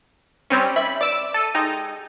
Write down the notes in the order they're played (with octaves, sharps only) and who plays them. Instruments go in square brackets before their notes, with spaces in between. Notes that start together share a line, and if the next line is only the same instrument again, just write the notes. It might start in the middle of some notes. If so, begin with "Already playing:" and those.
[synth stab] G3 C4 C#4 [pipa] C#5
[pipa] E5 [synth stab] B5
[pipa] D5 [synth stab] D6 E6
[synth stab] A4 D#7
[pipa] G#3 G4 [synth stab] D#4